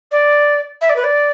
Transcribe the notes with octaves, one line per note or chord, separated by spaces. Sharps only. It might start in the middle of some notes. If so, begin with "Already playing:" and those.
D5
E5
D5
B4
D5